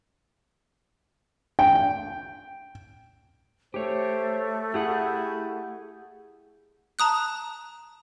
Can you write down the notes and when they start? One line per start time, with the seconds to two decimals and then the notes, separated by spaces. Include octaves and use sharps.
1.59 G5
3.74 A3 G4 C5 C#5
4.74 E4 G4 G#4 F#5
6.99 A5 A#5 D#6 F#6